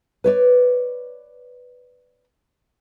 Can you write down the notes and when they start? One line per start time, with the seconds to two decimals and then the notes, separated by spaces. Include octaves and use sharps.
0.24 B4 C#5 D5